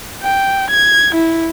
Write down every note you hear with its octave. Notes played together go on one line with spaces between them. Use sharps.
G5
G#6
E4